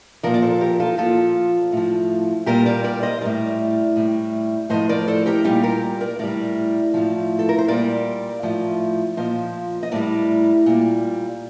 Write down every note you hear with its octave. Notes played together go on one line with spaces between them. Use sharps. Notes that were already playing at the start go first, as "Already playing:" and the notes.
A#2 F3 A#4 D5
D5
A4 C5
G4 A#4
F4 A4
A#2 F3 F4 A4
A2 F3
A#2 G3 G4 A#4
A#4 D5
A#4 D5
C5 D#5
A2 G3 A#4 D5
A2 G3
A2 F3 C5 D#5
A#4 D5
A4 C5
G4 A#4
A#2 G3 D#4 G4
G4 A#4
A#4 D5
A2 G3 A#4 D5
A2 F3
A4
A#4
C5
A#2 G3 A#4 D5
A2 F3
A#2 F3 C5 D#5
D#5
A2 G3 A#4 D5
A#2 G3